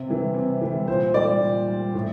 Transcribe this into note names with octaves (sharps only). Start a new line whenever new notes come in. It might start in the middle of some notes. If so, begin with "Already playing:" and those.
Already playing: C3
E3 G3
C3
E3 G3
A#2 C5
G3 D5
A#2
G3
A2